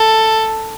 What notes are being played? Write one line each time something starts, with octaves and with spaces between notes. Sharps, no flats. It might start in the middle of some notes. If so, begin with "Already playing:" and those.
Already playing: A4